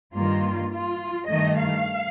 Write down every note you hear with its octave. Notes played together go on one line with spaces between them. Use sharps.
G2 D#3 A#3 F4
F4
G2 D#3 A3 D#5
F5